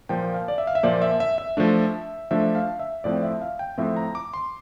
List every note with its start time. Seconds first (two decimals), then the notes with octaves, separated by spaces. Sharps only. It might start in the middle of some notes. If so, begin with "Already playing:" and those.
0.09 A#2 F3 A#3 G5
0.34 F5
0.48 D5
0.58 E5
0.67 F5
0.75 E5
0.83 A#2 F3 A#3 D5
1.02 E5
1.20 E5
1.38 E5
1.57 F3 A3 D4
2.31 F3 A3 D4 E5
2.55 F5
2.79 E5
3.04 A2 F3 C4 D5
3.23 E5
3.41 F5
3.59 G5
3.78 A2 F3 C4 E5
3.96 A#5
4.15 D6
4.34 C6